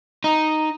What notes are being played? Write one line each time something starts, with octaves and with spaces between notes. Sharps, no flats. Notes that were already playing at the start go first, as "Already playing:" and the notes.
D#4